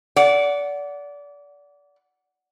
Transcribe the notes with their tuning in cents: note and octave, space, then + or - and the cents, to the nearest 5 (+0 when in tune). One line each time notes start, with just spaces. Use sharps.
D5 -25 F#5 +0